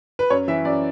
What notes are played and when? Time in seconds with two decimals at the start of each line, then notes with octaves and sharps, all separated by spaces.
0.19 B4
0.30 F#2 C#5
0.48 E3 E5
0.65 F#2 D5